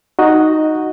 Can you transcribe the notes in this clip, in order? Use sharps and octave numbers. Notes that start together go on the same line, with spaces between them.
D#4 F#4 D#5